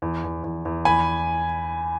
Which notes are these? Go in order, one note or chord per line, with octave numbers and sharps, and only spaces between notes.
E2
E2
E2
E2
E2 G#5 B5